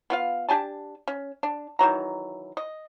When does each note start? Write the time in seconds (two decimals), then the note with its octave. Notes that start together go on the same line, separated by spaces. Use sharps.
0.10 B3 F4 F5
0.49 D4 G4 G#5 A5
1.08 C#4
1.43 D4
1.79 D#3 E3 F#3 A#5
2.57 D#5